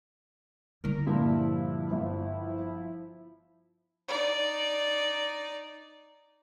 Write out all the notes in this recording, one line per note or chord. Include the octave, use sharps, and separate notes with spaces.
D3 G3 A#4
G2 A#2 F3 E4
G1
D#4 D5